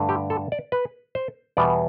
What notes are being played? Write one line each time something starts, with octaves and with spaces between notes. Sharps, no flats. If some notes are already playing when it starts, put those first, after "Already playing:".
Already playing: G2 D3 A3
G4
A4
D5
B4
C5
E2 B2 G3 B3 D5